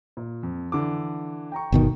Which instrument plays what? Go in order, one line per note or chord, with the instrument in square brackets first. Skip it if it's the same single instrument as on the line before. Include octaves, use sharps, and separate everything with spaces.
[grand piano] A#2
F2
D3 E3 D6
G5 A#5 C#6
[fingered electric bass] G1 B2 D#3